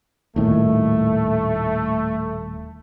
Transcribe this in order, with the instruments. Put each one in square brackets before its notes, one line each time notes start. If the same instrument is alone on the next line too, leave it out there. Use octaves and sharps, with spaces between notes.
[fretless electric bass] D#1 A2 D#3 [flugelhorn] A3